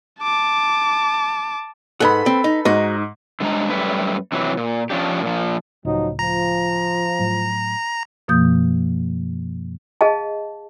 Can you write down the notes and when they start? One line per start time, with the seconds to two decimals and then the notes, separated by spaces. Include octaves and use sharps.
0.21 A5 D6
2.00 G#2 A4 B4 F#5 B5
2.26 C4
2.44 D#4
2.65 G#2 D#4 F#4 D#5
3.40 D3 G3 G#3 D4 A#5
3.70 F#2 G3 A3 B4
4.32 C3 E3 F#3
4.57 A#2
4.90 F3 C#4 D4 G4
5.22 A#2 F3
5.85 C#2 A2 F3 F#3 D#4
6.19 F3 A#5
7.19 A2 F#3
8.28 F#2 B2 F3 A#3 D#6 G6
10.01 G#4 D#5 F5 A5